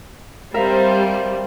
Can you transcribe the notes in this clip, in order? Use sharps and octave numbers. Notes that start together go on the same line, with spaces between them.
G3 C4 A#4 C5 E5 F5